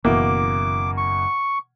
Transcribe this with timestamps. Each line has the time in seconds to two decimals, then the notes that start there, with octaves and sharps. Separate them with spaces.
0.05 F#1 B2 E3 A#3 D6
0.97 C#6